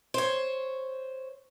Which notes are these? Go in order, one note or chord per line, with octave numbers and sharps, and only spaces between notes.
C5 C#5